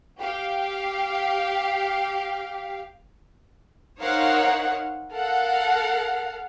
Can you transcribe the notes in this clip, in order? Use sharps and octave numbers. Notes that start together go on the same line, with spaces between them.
G4 F5
D#4 A#4 C5 C#5 F5 F#5
A4 A#4 F5 F#5